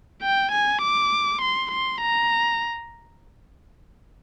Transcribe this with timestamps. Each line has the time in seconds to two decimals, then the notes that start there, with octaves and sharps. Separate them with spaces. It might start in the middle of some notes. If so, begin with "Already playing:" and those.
0.23 G5
0.52 G#5
0.82 D6
1.42 C6
1.71 C6
2.01 A#5